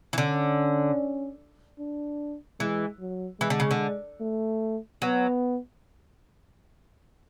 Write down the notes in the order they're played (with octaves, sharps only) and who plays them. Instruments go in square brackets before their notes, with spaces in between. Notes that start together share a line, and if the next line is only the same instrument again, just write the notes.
[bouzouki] E3
[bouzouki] D3 [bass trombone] C#4
[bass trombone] D4
[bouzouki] E3 [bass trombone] G#3
[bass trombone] F#3
[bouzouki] E3 [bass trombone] G#3
[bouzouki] D3
C#3
D3
[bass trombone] A3
[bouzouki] F#3 [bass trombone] B3